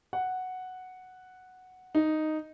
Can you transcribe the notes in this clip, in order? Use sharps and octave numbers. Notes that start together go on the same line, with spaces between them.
F#5
D#4